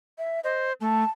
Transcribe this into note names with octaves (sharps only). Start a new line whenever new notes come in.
E5
C5 D#5
A3 A5